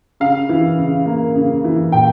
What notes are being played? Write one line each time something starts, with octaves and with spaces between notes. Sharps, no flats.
C#3 F5
E3
C#3
A#3
C#3
E3
A#2 G5